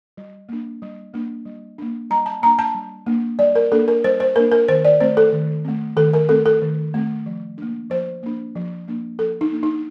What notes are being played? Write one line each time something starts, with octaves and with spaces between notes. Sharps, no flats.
G3
A#3 D4
G3
A#3 D4
G3
A#3 D4
G3 A#5
A5
A#3 D4 A#5
A5
G3
A#3 D4
G3 D5
A#4
A#3 D4 A4
A#4
G3 C5
C5
A#3 D4 A#4
A#4
D#3 C5
D5
A3 C4 C5
A4
D#3
A3 C4
D#3 A4
A#4
A3 C4 A4
A4
D#3
A3 C4
F3
A#3 D4
F3 C5
A#3 D4
F3
A#3 D4
F3 A4
D#4
A#3 D4
D#4